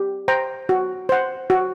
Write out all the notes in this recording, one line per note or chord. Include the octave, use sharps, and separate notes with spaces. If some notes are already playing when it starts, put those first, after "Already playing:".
Already playing: G4
C5 G5 A#5
F#4
C5 F#5
F#4